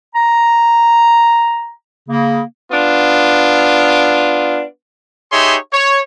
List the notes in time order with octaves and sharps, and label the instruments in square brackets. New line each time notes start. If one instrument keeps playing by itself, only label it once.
[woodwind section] A#5
C#3 A#3
[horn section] B3 D4 F4
[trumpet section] D#4 G4 G#4 C#5 E5 C6
C#5